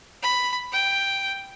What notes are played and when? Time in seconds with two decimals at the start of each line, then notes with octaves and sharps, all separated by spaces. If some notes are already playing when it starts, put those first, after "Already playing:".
0.22 B5
0.72 G5